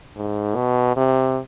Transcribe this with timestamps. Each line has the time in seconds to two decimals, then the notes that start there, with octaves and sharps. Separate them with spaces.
0.16 G#2
0.55 B2
0.97 C3